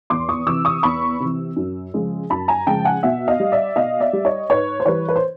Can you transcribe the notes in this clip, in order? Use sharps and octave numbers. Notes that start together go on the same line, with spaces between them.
E2 C6 D6
C#6 D#6
C3 E3 D6 E6
C#6 D#6
E2 B5 C#6
C3 E3
F#2
C#3 F3 G#3
F#2 A5 B5
G#5 A#5
C#3 F3 G#3 G5 A5
F#5 G#5
B2 E5 F#5
D#5 F5
G3
D5 E5
B2 D#5 F5
D5 E5
G3
C#5 D#5
G#2 B4 C#5
C5
E3 G3 B4 C#5
B4
C5